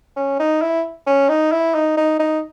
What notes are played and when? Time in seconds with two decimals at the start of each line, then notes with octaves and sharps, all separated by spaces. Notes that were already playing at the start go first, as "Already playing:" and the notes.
0.16 C#4
0.39 D#4
0.62 E4
1.07 C#4
1.29 D#4
1.52 E4
1.74 D#4
1.97 D#4
2.19 D#4